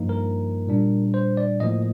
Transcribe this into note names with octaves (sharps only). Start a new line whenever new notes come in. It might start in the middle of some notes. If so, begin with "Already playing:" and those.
Already playing: G2 F3 A#3 D#4
A#4
A#2 G3 D4
C5
D5
A2 F3 A#3 D#5